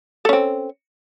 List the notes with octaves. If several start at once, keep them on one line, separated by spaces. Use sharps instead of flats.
C4 C#4 A4